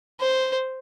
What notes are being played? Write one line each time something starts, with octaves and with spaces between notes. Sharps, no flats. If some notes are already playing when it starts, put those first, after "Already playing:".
C5